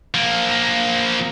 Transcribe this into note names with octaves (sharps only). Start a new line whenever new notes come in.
F3 A#3